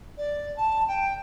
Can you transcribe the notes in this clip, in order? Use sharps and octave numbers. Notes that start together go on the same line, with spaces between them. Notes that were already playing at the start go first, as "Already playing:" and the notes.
D5
A5
G5